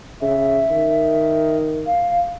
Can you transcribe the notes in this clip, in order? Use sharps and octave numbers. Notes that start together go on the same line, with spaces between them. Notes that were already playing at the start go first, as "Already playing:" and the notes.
C#3 E5
D#3
F5